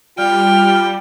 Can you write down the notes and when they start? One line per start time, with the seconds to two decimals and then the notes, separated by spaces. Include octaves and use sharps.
0.18 G3 F4 G5 F6